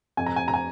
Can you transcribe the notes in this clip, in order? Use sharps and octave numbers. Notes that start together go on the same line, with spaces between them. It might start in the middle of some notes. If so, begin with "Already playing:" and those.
F2 G#5
A#5
G#5
A#5
G#5